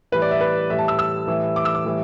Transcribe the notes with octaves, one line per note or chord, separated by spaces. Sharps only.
A2 E3 G3 B4
D5
E5
B4
A2 E3 G3 E5
A5
E6
E6
A2 E3 G3
D6
E6
D6
A2 E3 G3